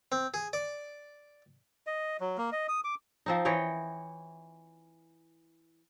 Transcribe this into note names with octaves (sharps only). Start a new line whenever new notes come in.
C4
G#4
D5
D#5
F#3
A#3
D#5
D#6
D6
F3 C4 D#4
E3 C#5 D#5 G5